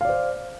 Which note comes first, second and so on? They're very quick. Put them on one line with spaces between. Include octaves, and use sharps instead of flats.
F5 D5 C5